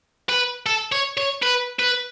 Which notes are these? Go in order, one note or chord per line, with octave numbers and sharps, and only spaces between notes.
B4
A4
C#5
C#5
B4
B4